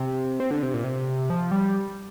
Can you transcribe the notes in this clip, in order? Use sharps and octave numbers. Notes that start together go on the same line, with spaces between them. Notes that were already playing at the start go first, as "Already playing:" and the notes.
Already playing: C3
C4
D3
C3
A#2
C3
F3
G3